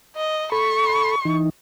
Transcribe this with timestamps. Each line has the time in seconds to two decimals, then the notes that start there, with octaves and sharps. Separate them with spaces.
0.16 D#5
0.52 A4 B5 C#6
1.25 E3 D#4